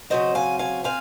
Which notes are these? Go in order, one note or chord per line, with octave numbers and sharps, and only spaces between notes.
C#3 F#3 C4 C5 D#5
F5 G#5
F5 G#5
C4 F5 G#5